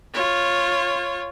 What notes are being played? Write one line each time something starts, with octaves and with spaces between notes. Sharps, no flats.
F4 C#5